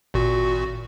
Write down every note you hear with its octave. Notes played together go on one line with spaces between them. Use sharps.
G#1 A#2 F#4